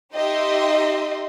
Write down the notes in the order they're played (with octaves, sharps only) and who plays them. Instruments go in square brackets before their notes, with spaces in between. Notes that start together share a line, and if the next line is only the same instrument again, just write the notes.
[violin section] D#4 G4 D#5 E5 C6